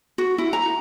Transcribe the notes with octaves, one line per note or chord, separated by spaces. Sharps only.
F#4
E4
A#5